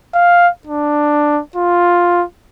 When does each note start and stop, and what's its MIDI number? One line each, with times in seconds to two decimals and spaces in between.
0.14 0.48 77
0.67 1.41 62
1.56 2.24 65